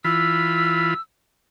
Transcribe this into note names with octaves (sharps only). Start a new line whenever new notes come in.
E3 F4 B5 E6